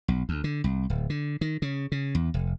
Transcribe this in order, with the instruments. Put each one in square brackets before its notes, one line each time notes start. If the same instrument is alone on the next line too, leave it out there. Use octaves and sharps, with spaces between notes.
[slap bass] B1
D2
D3
C2
D1
D3
D#3
C#3
C#3
E2
F1